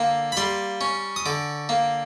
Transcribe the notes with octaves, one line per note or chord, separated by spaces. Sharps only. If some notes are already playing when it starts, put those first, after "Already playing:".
Already playing: D3 A#3
B5
G3 C6
C#4
D#6
D3 D6
A#3